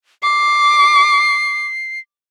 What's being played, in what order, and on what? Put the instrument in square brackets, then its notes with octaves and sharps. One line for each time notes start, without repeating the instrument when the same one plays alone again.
[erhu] D6 [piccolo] C7